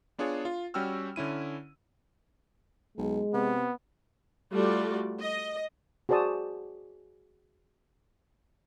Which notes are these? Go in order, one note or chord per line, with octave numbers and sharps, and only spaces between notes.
B3 D4 F4 G#4 C#5
F4
G3 C#4 F#4 G5 E6 F6
D3 C#4 E4 D#7
B1 G#3
C3 B3
G3 A3 F4 F#4 D5
D#5
F#4 G#4 C5 D5 A5 D#6